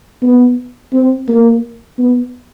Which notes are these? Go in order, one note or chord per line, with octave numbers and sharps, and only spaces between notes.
B3
C4
A#3
B3